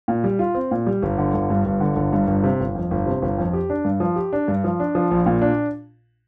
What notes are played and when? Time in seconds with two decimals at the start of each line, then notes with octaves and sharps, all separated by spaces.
0.08 A#2
0.24 G3
0.39 F4
0.55 C4
0.71 A#2
0.86 G3
1.02 G1
1.18 D3
1.34 G1
1.50 G2
1.65 G1
1.80 D3
1.96 G1
2.13 G2
2.28 G1
2.44 C3
2.60 G1
2.75 F2
2.91 G1
3.06 C3
3.22 G1
3.38 F2
3.53 G4
3.70 D4
3.85 G2
4.00 F3
4.16 G4
4.33 D4
4.48 G2
4.64 F3
4.80 D4
4.95 F3
5.11 A#1
5.26 A#2
5.42 D4